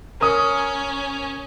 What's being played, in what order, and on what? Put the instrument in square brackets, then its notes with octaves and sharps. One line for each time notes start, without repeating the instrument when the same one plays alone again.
[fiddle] C#4 [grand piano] A#4 D#6